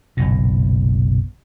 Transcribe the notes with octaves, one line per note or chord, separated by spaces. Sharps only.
F#1 B1 A#2